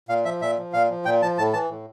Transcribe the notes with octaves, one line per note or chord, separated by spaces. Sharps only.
A#2 F5
F3 E5
A#2 E5
F3
A#2 F5
F3
A#2 G5
F3 A5
A2 A5
E3 A5
A2